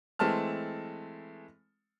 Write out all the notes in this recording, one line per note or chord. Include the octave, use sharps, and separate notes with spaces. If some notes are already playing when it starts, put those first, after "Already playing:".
E3 G#3 A3 C4 A5 F6